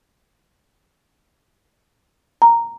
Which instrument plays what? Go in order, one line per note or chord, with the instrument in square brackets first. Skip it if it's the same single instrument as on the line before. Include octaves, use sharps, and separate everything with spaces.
[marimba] A#5